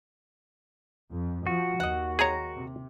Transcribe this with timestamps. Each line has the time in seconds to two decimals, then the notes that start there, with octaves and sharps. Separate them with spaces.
1.11 F2
1.47 F3 F#4
1.80 D#2 D#5 F#5
2.19 G#3 G#4 C#5 G5 A#5
2.54 C3